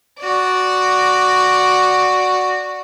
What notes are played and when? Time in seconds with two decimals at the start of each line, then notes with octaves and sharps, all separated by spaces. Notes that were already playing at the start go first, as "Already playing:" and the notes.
0.20 F#4 D5